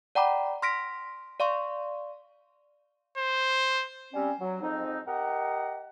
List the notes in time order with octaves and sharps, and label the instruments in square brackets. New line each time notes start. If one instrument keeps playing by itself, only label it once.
[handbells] D5 F#5 G5 A#5 B5 D6
C6 F6 A#6 B6 D7
D5 F5 C6 C#6
[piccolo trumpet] C5
[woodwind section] G3 C4 C#4
F#3
F2 G#2 C4 D#4
G4 A#4 D#5 F#5